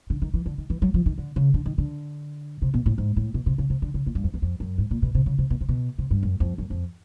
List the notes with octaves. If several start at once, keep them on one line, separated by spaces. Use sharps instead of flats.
D3
D#3
E3
D3
D#3
E3
F#3
F3
D#3
D3
C#3
D3
D#3
D3
C3
B2
A2
G#2
A2
B2
C3
C#3
C3
D3
C#3
A#2
G2
F2
E2
F2
F#2
G#2
A#2
B2
C3
C#3
C3
B2
C3
B2
C3
G2
F#2
F2
F#2
F2